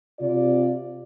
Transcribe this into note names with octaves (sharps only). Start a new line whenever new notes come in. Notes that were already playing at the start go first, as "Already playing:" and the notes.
C3 F4 D5